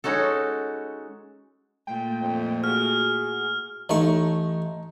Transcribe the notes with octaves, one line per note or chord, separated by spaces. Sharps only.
G#3 C#4 D#4 F#4 A4
A#2 A3 G5
F2
F#4 G#4 F6
A1 A3 D#4 C#6